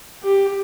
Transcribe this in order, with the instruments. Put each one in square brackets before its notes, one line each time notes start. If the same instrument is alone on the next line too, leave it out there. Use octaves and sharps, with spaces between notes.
[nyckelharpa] G4